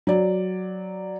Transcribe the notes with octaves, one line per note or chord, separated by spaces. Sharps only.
F#3 D5